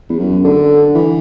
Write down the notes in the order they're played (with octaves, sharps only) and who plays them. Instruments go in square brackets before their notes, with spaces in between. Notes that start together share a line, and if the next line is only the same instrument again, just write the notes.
[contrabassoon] E2
F#2
D3
E3